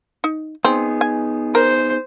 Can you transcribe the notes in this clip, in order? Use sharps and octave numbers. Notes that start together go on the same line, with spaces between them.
D#4
B3 C4 D#4 G#4
G#5
A#4 C5